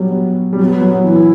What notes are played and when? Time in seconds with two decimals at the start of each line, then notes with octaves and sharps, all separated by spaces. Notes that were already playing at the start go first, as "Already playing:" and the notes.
Already playing: F#3 G3 B3
0.53 G3
0.59 F#3 B3
0.81 F#3
1.04 E3 E4